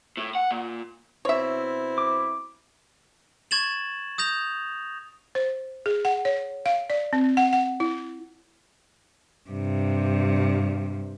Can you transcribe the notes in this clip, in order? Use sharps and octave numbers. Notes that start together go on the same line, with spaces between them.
A2
F#5
A#2
B2 C4 E4 C#5 E5
D6
C#6 G#6 A6 E7 F#7
D#6 G6 A#6 F7
C5
G#4
F#5
C#5
F5
D5
C4
F#5
F#5
E4
G2 C3